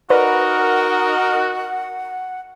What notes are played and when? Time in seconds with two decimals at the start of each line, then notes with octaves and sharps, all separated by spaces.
0.10 D#4 F#4 A#4 B4 D5 F#5